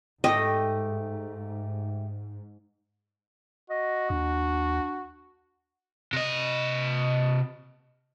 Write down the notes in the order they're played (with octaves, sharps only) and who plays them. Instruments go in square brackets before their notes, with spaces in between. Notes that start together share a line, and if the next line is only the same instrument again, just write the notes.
[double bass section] G#2 [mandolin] A3 E4 G4 [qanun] D#5
[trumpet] F#4 [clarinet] D#5
[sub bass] D#2 [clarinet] D4
[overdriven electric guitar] C3 D#5